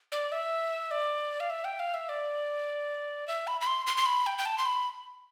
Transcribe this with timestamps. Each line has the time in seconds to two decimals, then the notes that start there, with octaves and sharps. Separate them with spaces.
0.12 D5
0.32 E5
0.91 D5
1.40 F5
1.50 E5
1.65 G5
1.79 F5
1.94 E5
2.09 D5
3.28 E5
3.47 B5
3.61 B5
3.67 C6
3.87 C6
3.97 C6
4.06 B5
4.26 G5
4.38 G5
4.46 A5
4.58 C6
4.66 B5